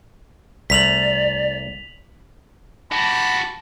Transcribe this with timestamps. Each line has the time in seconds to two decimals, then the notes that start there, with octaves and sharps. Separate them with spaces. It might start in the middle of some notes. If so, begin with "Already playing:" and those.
0.70 C2 A3 D5 B6 F7 F#7
2.92 F#4 G4 A5 B5